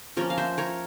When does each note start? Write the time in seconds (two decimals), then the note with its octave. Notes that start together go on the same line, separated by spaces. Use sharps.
0.17 F3 A#3 C#4 A#4 C#5
0.30 F5
0.38 C5 E5
0.58 A#4 C#5